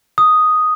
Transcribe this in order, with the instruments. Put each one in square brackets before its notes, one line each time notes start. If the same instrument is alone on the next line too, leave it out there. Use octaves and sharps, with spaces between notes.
[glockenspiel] D#6